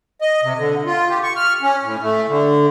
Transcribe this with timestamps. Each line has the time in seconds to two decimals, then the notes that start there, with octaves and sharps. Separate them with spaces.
0.21 D#5
0.43 C3
0.58 D3
0.86 F4
1.09 G4
1.23 C#6
1.36 F6
1.62 C#4
1.83 A2
2.02 A3
2.28 D3